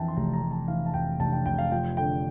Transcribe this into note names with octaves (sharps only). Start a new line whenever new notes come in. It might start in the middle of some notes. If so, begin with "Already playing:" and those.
Already playing: F2 E3 G5 A5
C6
F1 A#5
A#5
F1
A5
E3 F5
A5
F2 G5
F1 A5
G5
F1 G5
F5
F3 G5
D3 G5